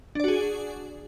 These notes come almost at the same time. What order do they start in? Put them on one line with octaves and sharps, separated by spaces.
D4 D5 F#4 G#4